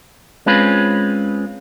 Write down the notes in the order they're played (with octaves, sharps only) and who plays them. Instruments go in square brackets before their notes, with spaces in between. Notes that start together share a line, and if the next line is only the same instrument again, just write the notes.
[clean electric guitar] G#3 C4 C#4 F4 B4